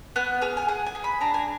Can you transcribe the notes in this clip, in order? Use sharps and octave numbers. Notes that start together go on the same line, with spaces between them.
B3 F#6
G#4 F6
G#5
G#4 F#5
G#5
G#4
B5
D4 A#5
G#5